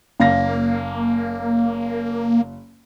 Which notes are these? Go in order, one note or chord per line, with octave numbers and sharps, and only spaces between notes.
F#1 A#3 F5 A#6